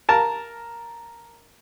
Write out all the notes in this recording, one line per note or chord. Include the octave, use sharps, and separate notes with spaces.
A#4 A5